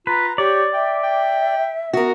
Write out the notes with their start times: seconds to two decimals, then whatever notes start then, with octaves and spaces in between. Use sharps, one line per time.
0.07 F4 B4 A#5
0.38 G4 C#5 D5
0.73 E5 G5
1.03 G5
1.93 B3 F#4 A#4